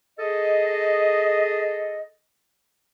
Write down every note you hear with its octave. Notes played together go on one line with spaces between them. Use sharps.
G#4 A4 D#5